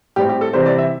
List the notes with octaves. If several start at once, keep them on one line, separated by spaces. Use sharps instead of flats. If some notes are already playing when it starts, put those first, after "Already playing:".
A2 G3 C4 G4
G4
A4
C3 E3 G3 C4 C5
D5
E5